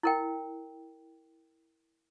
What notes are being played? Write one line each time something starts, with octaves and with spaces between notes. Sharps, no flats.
E4 A#4 G5